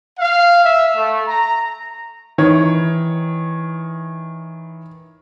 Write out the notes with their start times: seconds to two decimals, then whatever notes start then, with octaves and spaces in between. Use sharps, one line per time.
0.19 F5
0.65 E5
0.96 A3
1.28 A#5
2.38 D#3 E3 C#5